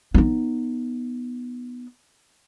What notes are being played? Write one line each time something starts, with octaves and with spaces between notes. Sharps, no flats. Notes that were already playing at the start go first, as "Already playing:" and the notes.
B3 D#4